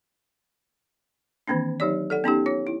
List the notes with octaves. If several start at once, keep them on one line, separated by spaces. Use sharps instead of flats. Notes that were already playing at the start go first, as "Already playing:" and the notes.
D#3 E3 A#3 C4 D4
F#3 D#4 G4 C#5 D5
A4 D5 F#5
B3 C#4 D#4 G4
F4 C#5
E4